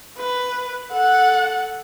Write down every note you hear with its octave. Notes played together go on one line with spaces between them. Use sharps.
B4
A4 F#5